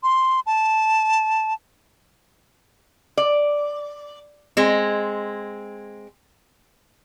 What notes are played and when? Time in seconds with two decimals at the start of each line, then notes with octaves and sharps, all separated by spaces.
0.03 C6
0.46 A5
3.17 D5
4.57 G#3 C4